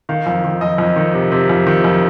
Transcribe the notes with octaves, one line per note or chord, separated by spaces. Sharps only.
D#3 F5
F2
D#3
F2 D#5
F2
D#3
C3
C3
F2
D#3
F2